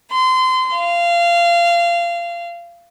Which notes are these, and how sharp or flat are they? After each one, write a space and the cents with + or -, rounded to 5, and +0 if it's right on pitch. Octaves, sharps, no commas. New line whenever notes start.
C6 -25
F5 -20